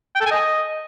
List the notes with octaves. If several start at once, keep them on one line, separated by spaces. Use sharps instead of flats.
G5
A4
G#5
D#5